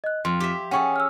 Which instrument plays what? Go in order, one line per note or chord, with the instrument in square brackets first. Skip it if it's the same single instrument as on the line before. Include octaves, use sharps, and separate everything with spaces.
[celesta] D#5 F#6
[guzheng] F2 [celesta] C6
[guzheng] G4 E5
[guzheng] C#4 G#4 A4 [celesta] F#5 G5 C#6
[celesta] E6 F6